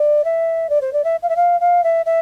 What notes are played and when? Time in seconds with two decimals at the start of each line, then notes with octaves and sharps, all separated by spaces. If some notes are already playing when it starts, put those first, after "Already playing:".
Already playing: D5
0.24 E5
0.69 D5
0.81 C5
0.92 D5
1.04 E5
1.22 F5
1.29 E5
1.36 F5
1.60 F5
1.83 E5
2.05 E5